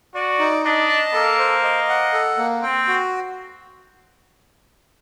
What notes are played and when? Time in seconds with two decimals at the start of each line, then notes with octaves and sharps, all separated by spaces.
0.15 F#4 D5
0.39 D#4
0.64 D4 D#5
0.89 A5
1.14 A#3 A4
1.39 C5
1.64 D#5
1.89 F#5
2.13 A4
2.38 A#3
2.63 C4 G5
2.88 F#4